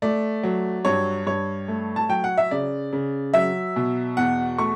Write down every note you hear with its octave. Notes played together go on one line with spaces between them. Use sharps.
A3 D5
F#3
G2 C#5
G2 C#5
A3
A5
F#3 G5
F#5
E5
C#3 D5
C#3
F#3 E5
B2
E2 F#5
A3 C#6